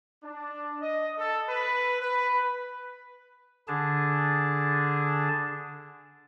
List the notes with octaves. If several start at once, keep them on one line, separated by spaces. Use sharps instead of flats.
D4
D#5
A4
B4
B4
D3 D4 G#4 A5